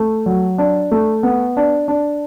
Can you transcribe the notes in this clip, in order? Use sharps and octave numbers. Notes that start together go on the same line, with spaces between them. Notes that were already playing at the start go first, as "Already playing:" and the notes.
Already playing: A3
F#3
D4
A3
B3
D4
D4